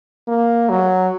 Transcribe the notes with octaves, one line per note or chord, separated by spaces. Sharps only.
A#3
F#3